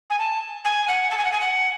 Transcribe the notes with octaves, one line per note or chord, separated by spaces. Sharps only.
G#5
A5
G#5
F#5
A5
G#5
F#5
G#5
F#5